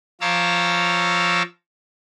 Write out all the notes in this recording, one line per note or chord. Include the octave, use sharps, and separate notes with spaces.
F3 C#5 F5 A#5 D6 E6